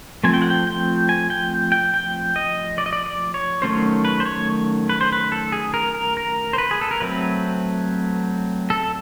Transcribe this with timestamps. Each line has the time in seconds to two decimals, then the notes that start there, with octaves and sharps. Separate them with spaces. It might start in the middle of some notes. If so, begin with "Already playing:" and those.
0.24 F3 A3 C4 G#5
0.34 G5
0.42 F#5
0.50 G5
0.67 G5
1.09 G#5
1.30 G5
1.72 G5
1.94 G5
2.36 D#5
2.78 D5
2.86 D#5
2.93 D5
3.06 D5
3.34 C#5
3.62 D#3 F#3 A3 C#4 C5
4.05 B4
4.20 C5
4.25 C#5
4.90 B4
5.01 C5
5.13 B4
5.32 A4
5.52 G#4
5.74 A#4
5.95 A#4
6.17 A#4
6.53 C5
6.58 B4
6.71 G#4
6.81 A4
6.91 A#4
7.00 F#3 A3 C4 B4
8.70 A4